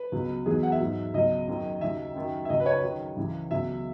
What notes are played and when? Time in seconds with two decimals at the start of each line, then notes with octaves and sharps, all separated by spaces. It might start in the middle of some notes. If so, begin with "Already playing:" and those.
Already playing: B4
0.12 C#2 B2 F#3
0.46 E2 B2 F#3 G#4
0.63 F#5
0.72 E5
0.80 G#2 F#3
1.14 C#2 B2 F#3 D#5
1.47 F#2 D#3 F#3
1.81 D#2 C#3 F#3 E5
2.15 F#2 D#3 F#3
2.45 E5
2.49 C#2 C#3 F#3 D#5
2.60 B4
2.66 C#5
2.83 F#2 D#3 F#3
3.17 C#2 C#3 E3
3.51 C#2 B2 F#3 E5